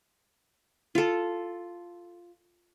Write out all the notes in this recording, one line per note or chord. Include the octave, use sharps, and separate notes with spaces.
F4 A4